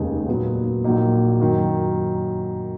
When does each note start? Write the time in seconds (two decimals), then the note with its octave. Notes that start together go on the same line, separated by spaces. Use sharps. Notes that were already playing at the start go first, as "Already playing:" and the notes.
Already playing: F1 D#2 C#3 G#3 D#4
0.28 A#2 F#3 B3
0.84 A#1 A#2 F#3 A#3 D#4
1.40 F#2 D#3 F#3